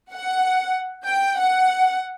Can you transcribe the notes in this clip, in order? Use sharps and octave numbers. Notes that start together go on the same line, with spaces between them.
F#5
G5
F#5